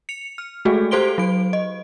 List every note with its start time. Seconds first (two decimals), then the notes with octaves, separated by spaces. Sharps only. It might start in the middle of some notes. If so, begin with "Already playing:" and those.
0.09 C#7 F7
0.38 F6
0.65 G#3 A3 F#4 G#4 A4
0.91 G4 A4 C5 C6 D7 G7
1.18 F#3 D7
1.53 D#5